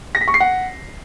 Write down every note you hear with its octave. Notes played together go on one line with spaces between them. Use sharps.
A#6
B6
C#6
C7
F#5